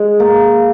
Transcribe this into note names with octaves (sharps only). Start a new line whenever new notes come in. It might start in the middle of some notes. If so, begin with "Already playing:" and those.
Already playing: G#3
A#3